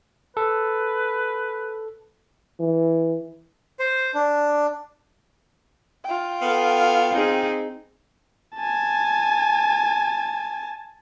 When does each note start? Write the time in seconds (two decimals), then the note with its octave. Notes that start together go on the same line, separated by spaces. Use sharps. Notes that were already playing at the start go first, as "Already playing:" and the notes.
0.37 A4 B4
2.60 E3
3.79 C5
4.14 D4
6.05 F4 G5
6.41 B3 A4 F5
7.10 C4 D#4 G#4
8.58 G#5 A5